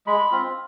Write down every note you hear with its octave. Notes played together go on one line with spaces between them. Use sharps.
G#3 B5
C4 F4